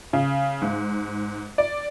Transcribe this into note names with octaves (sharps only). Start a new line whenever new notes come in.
C#3
G#2
D5